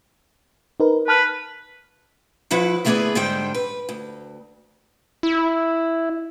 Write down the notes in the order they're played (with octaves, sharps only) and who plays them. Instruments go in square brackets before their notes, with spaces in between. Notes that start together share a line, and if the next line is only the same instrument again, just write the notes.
[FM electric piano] D#4 A#4 B4
[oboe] B4 [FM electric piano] A5 F6 F#6
[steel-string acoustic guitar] F3 E4 B4 F#5
D2 A3 B3 G#4 B4 D5
G#2 D3 G3 C5 G5
B4
D2
[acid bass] E4